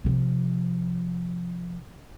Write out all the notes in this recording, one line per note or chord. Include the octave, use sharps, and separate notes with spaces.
C3 F3